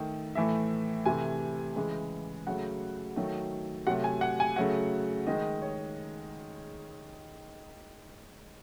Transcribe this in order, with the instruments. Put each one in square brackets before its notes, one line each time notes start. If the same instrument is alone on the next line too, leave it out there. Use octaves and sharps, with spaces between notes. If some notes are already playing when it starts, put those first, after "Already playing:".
Already playing: [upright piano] D#3 A3
A2 E3 A3 E5
C3 E3 A3 G#5
C#3 E3 G#3
C#3 F#3 A3 F#5
D#3 F#3 A3
C3 F#3 A3 F#5
G#5
F#5
G#5
C#3 F#3 A3 F#5
D#3 G#3 D#5
C#5